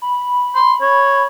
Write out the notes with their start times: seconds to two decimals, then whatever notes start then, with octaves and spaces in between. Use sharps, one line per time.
0.02 B5
0.55 C6
0.82 C#5